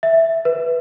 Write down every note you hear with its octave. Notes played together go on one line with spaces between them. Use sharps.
E5
B4